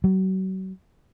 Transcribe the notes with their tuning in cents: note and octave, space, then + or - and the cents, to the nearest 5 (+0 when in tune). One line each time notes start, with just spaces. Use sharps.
F#3 +35